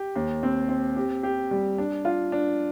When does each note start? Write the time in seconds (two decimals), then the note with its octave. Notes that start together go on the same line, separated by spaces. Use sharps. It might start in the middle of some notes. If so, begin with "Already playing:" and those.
Already playing: G4
0.16 D#2
0.43 C4
0.69 C4
0.96 G4
1.23 G4
1.51 G3
1.78 D4
2.05 F4
2.32 D4